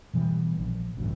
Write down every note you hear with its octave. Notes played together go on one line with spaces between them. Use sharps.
B2 E3 G3 B3
A#1
A1 D2 G2 D3